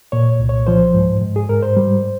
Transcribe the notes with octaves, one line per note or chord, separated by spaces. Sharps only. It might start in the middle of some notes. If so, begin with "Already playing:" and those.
A#2 C#5
C2
C#5
F3 C5
G#2
G#2
G#4
G#2 A#4
C5
G3